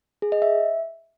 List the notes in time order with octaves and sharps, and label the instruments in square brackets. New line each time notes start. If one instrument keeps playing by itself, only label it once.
[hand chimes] G#4
D#5
E5